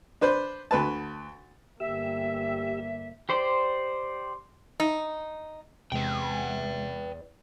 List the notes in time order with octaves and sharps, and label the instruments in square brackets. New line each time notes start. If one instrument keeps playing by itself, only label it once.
[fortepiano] D4 B4 C5
D2 B4 A5
[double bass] G1 A#3 [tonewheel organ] G4 E6 [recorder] E5
[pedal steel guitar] G4 C5 D5 C6
[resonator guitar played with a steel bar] D#4
[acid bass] E2 [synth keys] C3 G#3 [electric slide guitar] B4 G5